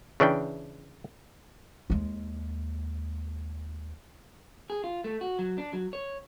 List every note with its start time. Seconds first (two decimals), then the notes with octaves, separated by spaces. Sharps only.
0.20 C#3 E3 D4 G5
1.90 D#2 G#3
4.70 G#4
4.84 F4
5.04 A3
5.21 F#4
5.39 F#3
5.58 D4
5.73 F#3
5.93 C#5